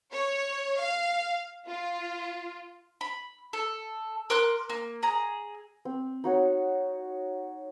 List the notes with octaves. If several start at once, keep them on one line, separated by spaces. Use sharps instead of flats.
C#5
F5
F4
B5
A4
A#4 C6 D6 F#6
A#3
G#4 A#5
C4
D#4 F#4 C#5